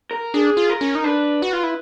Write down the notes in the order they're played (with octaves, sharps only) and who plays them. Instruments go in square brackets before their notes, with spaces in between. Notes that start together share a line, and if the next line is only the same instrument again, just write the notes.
[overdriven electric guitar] A#4
[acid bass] D4 [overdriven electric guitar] G#4
[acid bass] F4
[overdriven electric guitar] A#4
[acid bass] C#4
D#4
[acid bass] D4 [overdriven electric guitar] B4
[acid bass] F#4
F4
E4